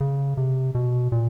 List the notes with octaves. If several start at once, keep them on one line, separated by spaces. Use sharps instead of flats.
C#3
C3
B2
A#2